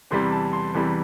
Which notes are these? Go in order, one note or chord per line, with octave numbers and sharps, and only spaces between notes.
E2 C3 E3 G3 C6
A5
C6
E2 C3 E3 G3